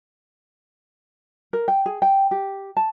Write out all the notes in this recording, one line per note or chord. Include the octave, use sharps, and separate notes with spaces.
A#4
G5
G#4
G5
G4
A5